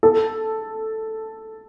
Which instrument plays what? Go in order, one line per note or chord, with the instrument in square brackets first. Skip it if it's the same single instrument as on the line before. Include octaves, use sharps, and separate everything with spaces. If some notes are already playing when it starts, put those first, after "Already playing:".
[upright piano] A4